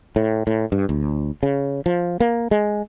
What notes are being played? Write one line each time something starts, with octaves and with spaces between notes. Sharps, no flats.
A2
A2
G2
D2
C#3
F3
A#3
G#3